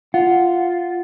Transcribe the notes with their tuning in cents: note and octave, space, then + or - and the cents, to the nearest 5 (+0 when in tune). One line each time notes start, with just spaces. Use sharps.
F4 -5 F#5 +0